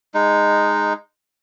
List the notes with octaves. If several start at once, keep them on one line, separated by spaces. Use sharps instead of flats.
G#3 D#4